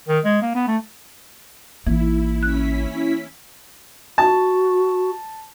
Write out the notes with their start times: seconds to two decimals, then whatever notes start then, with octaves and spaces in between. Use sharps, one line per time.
0.08 D#3
0.25 G#3
0.42 A#3
0.55 B3
0.67 A3
1.87 A1 E3 A#3 D#4 E4
2.43 C#4 E4 F#6 B6
4.18 F#4 A5